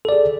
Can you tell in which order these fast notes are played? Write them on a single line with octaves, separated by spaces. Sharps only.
A4 D5 G#4